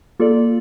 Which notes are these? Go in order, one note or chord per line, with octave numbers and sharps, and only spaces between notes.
A#3 F4 A4 D5